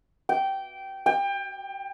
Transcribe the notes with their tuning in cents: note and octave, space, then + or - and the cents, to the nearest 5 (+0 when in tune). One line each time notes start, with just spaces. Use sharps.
G5 -15
G5 +25